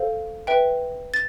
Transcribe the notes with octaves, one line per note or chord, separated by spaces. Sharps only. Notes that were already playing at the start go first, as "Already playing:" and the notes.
Already playing: A4 C5 F5
B4 E5 G5
A6